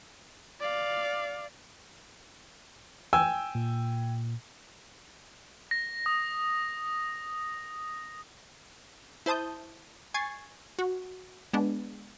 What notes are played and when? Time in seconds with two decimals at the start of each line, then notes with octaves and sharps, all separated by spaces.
0.60 D5 F5
3.13 G5 G#5 E6
3.55 A#2
5.71 A#6
6.06 D#6
9.26 E4 C5 A5 D#6 G6
10.14 G#5 C#6 G#6 A6 C7
10.79 F#4
11.53 G#3 B3 D4